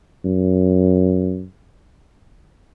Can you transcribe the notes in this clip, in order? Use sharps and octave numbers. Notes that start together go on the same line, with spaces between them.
F#2